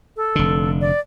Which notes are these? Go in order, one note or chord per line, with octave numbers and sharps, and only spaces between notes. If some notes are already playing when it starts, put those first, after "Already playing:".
A4
F1 D3
D5